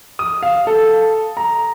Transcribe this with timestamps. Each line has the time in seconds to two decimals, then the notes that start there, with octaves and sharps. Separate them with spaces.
0.19 D#6
0.43 F5
0.67 A4
1.37 A#5